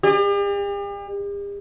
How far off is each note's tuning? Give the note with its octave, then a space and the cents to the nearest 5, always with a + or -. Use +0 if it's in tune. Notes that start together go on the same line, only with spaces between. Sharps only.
G4 +45 D5 +45